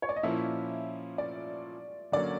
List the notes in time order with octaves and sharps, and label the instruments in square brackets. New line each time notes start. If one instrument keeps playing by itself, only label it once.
[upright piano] C#5
D5
D#5
[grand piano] A#2 F3 A#3 C#4 E4 [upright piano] E5
[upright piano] D5
[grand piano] D3 F#3 A#3 C#4 [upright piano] D5